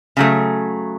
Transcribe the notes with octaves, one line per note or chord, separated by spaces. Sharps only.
C#3 F#3 A3